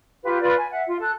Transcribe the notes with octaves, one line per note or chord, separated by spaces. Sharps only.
F4 G4 B4
F4 B4 D5
G#5
E5 F#5
F4
A4 F#6